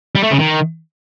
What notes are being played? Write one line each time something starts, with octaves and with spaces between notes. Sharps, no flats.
G3
A3
C#3
D#3